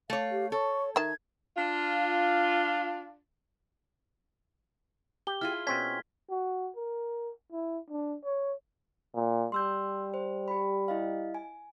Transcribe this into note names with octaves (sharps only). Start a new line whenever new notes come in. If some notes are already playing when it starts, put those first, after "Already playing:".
A3 C#5 F5
G4
A4 C#5 C#6
D#3 E5 A5 G#6
D4 F4
G4 G7
E4 F4 G#4 F6
B2 C4 C#4 G#6 B6
F#4
A#4
E4
D4
C#5
A#2
G3 C6 E6 G6
C5
G4 B5
E4 D#5 F5
G#5